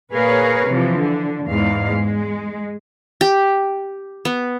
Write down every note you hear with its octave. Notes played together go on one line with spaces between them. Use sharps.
A#2 G#4 A#4 B4 C#5 F5
C3 E3 F3
D3
E2 G#2 F5
G#3
G4
B3